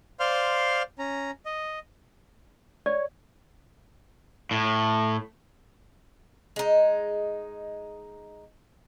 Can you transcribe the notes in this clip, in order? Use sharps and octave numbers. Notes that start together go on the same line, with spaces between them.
C5 D5 F5 C6 F6
C#4 A#5
D#5
C#5 D5
A2
G#3 D#4